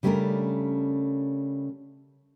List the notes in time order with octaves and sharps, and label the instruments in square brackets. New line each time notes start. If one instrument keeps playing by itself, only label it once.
[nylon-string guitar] C#3 G3 A3 C#4 D4 A#4